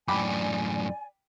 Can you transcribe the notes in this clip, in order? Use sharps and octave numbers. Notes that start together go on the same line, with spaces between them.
F#2 A2 D5 G5 G#5 B5 D6